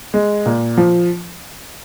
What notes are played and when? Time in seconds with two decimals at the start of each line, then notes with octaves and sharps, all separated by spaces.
0.14 G#3
0.46 A#2
0.77 F3